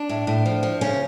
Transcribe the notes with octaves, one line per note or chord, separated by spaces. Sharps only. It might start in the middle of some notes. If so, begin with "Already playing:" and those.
Already playing: D4
A2
A2
F3
F3
C#3 C#4